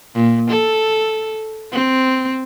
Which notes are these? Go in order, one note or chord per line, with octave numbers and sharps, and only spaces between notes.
A#2
A4
C4